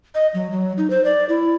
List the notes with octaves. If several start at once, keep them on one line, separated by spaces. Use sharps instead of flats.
D#5
F#3
F#3
D#4
C5
D5
E4